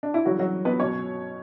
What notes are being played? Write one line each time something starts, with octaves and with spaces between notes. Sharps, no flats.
D4
E4
C#3 E3 F#3 G3 F#4
F#3 F#4
B3 B4
B2 F#3 C#4 C#5